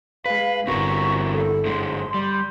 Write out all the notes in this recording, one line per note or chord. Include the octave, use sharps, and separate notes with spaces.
G#3 B4 F5
G1 C4 E4 F#4 A#4 C#6
A4
G#2 D3 G#3 C6
G3